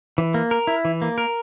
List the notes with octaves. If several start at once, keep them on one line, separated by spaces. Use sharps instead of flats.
E3
A#3
A#4
E4
E3
A#3
A#4